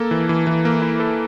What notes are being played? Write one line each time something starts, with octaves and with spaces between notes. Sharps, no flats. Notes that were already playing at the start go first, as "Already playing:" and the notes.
Already playing: A#3 A4
E3
E3
E3
A#3
E4
A4